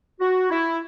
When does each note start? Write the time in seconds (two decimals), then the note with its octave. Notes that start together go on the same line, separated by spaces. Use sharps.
0.20 F#4
0.50 E4